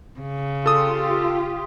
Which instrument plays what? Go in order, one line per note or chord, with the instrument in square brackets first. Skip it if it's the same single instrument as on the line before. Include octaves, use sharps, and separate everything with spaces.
[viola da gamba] C#3
[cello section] F4 G4 [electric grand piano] A4 D#6